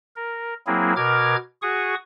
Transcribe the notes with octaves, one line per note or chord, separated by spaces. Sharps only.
A#4
F#3 A#3 C4 E4 G#4
B2 A#4 D6 F6 G#6
F#4 G#4 C#6 D#6